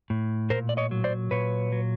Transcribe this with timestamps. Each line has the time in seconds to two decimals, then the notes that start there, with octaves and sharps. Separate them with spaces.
0.10 A2
0.50 A#2 A#4 C5
0.69 D5
0.77 C#5 D#5
0.91 F#3
1.04 C5 D5
1.31 A#2 B4 C#5
1.72 F#3